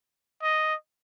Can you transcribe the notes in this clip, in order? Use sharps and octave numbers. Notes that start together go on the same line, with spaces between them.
D#5